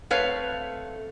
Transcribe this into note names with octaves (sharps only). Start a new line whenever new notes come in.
A3 C4 B4 C#5 F5